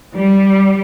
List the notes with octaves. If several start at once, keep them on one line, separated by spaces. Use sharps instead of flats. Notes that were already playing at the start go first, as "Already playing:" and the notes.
G3